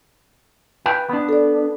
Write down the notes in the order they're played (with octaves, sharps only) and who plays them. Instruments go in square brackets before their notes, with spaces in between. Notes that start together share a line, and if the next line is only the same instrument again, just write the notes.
[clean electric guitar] B4 G5
B3 D4
[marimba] A4 D5